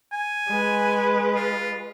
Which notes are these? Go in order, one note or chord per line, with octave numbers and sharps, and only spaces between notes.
G#5
G#3 B4
F4